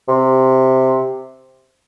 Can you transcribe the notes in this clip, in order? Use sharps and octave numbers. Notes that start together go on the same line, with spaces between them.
C3